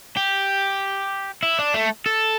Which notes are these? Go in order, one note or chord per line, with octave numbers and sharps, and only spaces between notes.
G4
E4
D4
A3
A4